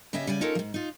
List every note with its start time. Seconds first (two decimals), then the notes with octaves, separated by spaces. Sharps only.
0.13 C#3 G4 D#5 E5 G#5
0.27 C#3 G3 D5 G#5
0.41 C#4 D#4 F4 A4 A#4 C#5
0.55 G#2 F3
0.74 D#4 F4